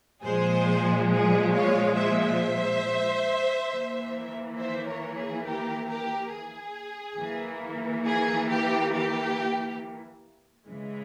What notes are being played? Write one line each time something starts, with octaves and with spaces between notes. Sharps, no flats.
A#2 F3 G#3 G#4 C5
G#4
C#5 F5
C5 E5
E3 A#3
C5 E5
A#4 C#5
G#4
G4 A#4
G4 A#4
G#4
E3 A#3
G#4
G4
G4
C#3 E3 G#3